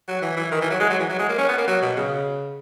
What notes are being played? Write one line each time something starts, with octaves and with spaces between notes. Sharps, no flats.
F#3
E3
E3
D#3
E3
F#3
G#3
F#3
E3
F#3
G#3
A#3
C#4
B3
A#3
F#3
B2
C#3